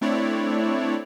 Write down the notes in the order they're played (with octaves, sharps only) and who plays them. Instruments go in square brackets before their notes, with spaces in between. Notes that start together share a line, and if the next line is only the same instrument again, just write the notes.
[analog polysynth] A3 C4 D4 E4 C#5 D5